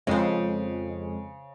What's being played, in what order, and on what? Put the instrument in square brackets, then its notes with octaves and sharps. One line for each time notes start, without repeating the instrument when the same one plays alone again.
[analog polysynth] F2 G#3 [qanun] C#3 C5